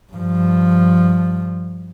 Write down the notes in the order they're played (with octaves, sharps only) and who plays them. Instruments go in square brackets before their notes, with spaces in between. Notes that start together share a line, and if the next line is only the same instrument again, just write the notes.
[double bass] G2 F3